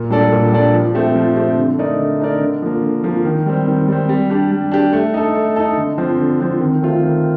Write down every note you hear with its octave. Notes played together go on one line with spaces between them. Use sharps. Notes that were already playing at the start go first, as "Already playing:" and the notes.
Already playing: A#2
G3 D4 A4 D5
A#2
G3 D4 A4 D5
F3
A3 C4 G4
F3
A3 C4 G4
D3
A3 D#4 A#4 D5
D3
A3 D#4 A#4 D5
D3
F3 A#3
D3
F3 A#3
D#3
G3 C4
D#3
G3 C4
G3
D4 G4
G3
D4 G4
A3
D#4 A4
A3
D#4 A4
D3
F3 C4
D3
F3 C4
D#3
A3 C4 F4
D#3